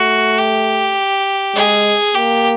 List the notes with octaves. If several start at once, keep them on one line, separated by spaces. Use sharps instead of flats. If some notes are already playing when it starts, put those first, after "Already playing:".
Already playing: A3 F#4
G4
G#3 G#4
A#3 G4